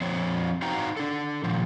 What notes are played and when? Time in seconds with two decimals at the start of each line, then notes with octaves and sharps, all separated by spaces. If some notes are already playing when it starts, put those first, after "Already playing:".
0.01 F3 C4 C5 C#5
0.62 D#4 F#4 C5 F5 G5 A#5
0.97 D4 A4
1.44 A#2 D#3 F3